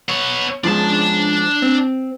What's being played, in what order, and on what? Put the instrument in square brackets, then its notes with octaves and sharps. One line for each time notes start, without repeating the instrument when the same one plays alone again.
[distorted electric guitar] B3 C#5
[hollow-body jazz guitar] G#2 F3 [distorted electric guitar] D4 A5
[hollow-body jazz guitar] C4